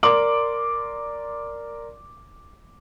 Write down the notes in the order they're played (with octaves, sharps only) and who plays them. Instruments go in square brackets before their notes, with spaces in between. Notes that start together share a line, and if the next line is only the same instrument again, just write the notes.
[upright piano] A#4 D5 C6 D6 F#7